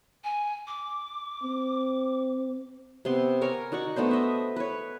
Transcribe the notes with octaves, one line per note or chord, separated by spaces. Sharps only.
G#5
D6
C4
C3 B3 C6
A#4 C#5 G#5 A#5
D#4 F#4 D5 C#6
A3 B3 D4 C5
D#5 E5
B4 C#5